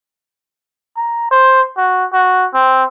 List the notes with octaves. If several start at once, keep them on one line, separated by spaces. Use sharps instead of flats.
A#5
C5
F#4
F#4
C4